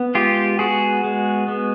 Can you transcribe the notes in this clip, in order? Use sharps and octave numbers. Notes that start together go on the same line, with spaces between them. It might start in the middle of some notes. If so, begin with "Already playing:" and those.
Already playing: B3
G#3 F4 G4
B3 F#4 G#4
G#3
B3